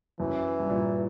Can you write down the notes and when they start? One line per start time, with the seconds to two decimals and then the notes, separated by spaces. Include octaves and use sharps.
0.20 F#2 E3
0.60 G2
0.70 A#2